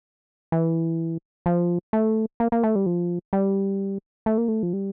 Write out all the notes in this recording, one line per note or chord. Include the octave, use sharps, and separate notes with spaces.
E3
F3
A3
A#3
A#3
A3
G3
F3
G3
A3
A#3
A3
F3
G3